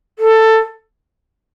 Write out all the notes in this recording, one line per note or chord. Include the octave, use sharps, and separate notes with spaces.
A4